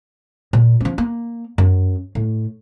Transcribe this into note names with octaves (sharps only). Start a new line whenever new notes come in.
A#2
F3 C#4
A#3
F#2
A2